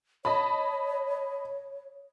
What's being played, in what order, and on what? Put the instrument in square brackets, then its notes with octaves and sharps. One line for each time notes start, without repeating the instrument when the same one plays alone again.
[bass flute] C#5 [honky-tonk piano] D#5 A5 B5